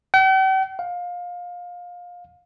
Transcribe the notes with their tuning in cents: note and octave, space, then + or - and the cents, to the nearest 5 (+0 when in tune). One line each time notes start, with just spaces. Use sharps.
G5 -45
F5 +25